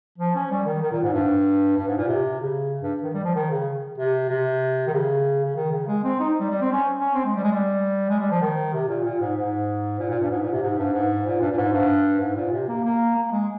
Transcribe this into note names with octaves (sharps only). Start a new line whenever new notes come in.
F3
C#4
G3
D#3
D#3
A#2
G#2
G2
G2
G#2
A#2
C3
C#3
G2
D#3
G3
F3
D#3
C#3
C3
C3
D#3
C#3
C#3
D#3
C#3
G#3
C4
D#4
G3
G3
C4
C#4
C#4
C4
G#3
G3
G#3
G3
G#3
G3
F3
D#3
C3
A#2
A#2
G#2
G#2
A#2
A#2
G2
G#2
A#2
C3
G#2
G2
G#2
A#2
G2
A#2
G#2
G2
G#2
A#2
C3
A#3
A#3
A#3
G#3